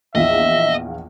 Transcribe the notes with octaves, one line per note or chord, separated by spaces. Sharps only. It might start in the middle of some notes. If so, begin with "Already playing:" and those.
A#1 E2 F4 D#5 E5